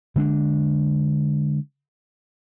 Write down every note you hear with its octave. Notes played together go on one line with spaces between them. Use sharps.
D3 G#3 C#4 D4